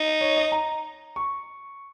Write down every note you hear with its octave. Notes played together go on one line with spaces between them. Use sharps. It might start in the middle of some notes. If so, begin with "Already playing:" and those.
Already playing: D#4
C#5
D#5
A#5
C#6